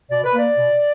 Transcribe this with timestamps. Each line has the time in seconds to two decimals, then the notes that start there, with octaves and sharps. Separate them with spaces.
0.10 B2 D5
0.24 B4
0.34 A#3 D5
0.57 B2